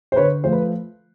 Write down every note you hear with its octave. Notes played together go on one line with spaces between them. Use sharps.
C5
D3 B4 C#5
F3 A3 C5
B4